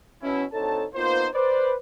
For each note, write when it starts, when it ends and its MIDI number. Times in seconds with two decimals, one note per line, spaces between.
0.23 0.44 47
0.23 0.44 61
0.23 0.44 64
0.53 0.85 38
0.53 0.85 60
0.53 0.85 63
0.53 0.85 69
0.53 0.85 73
0.53 0.85 81
0.95 1.28 58
0.95 1.28 59
0.95 1.28 63
0.95 1.28 65
0.95 1.28 72
1.34 1.75 71
1.34 1.75 72
1.34 1.75 74